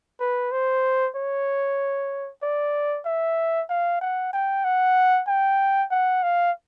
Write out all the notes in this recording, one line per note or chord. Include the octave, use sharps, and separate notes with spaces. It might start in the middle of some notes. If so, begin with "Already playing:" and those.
B4
C5
C#5
D5
E5
F5
F#5
G5
F#5
G5
F#5
F5